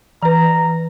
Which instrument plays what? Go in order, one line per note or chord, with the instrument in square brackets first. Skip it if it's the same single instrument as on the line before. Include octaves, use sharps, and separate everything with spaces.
[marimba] E3 B4 [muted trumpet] A#5